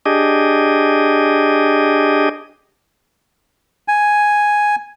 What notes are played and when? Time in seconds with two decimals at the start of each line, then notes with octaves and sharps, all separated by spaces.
0.06 D4 G4 G#4 D#5
3.88 G#5